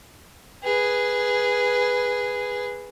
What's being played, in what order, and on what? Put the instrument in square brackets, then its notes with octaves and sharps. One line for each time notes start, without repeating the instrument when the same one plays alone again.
[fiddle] G#4 B4